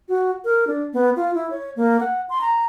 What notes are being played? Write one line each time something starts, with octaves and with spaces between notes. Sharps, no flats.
F#4
A#4
D4
B3
F4
E4
C#5
A#3
F#5
C6
A#5